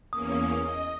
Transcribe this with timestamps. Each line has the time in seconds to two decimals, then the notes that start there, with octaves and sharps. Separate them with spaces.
0.13 E2 A#3 C#4 D#6
0.63 D#5